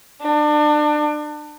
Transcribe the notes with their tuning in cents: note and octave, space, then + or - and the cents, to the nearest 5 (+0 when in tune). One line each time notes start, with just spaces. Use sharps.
D4 +30